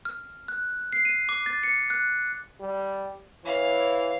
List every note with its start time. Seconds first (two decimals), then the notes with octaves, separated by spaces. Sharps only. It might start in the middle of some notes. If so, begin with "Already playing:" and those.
0.05 F6
0.48 F#6
0.93 C7
1.05 D#7
1.29 D6
1.46 A6
1.63 C#7
1.90 F#6
2.60 G3
3.45 E3 C#5 F5